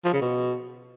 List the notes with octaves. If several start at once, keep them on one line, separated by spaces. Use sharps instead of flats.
F3
C#3
B2